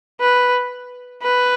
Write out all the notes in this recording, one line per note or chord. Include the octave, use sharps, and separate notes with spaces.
B4
B4